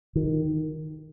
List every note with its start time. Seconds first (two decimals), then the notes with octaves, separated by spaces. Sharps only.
0.15 D#3